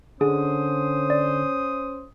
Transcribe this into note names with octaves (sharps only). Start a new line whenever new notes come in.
D3 C#4 G#4 C5 D#6
D5